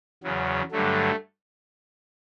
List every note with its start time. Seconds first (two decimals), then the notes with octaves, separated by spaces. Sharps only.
0.23 E2 C#3 F#3
0.72 G2 D3 F#3 A3